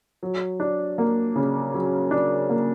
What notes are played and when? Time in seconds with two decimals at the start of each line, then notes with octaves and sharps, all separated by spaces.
0.23 F#3
0.60 D4
0.98 A#3
1.36 C#3
1.74 F#3
2.11 D4
2.49 A#3